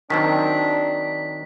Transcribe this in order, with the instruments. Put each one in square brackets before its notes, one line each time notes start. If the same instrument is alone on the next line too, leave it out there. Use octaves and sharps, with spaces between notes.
[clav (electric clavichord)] D#3 F#3 C4 [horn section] D4 [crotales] B6